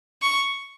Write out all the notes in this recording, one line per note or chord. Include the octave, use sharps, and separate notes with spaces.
C#6